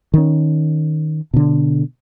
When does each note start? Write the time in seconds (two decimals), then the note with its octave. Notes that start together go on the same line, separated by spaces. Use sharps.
0.14 D#3 C#4
1.34 B2 D3